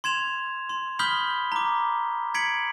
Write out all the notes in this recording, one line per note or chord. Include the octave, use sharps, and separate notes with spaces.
C6 G#6 E7 F7
C6
B5 D#6 F6 G6 B6 G7
A#5 D6
G#6 B6 C#7 D7 F#7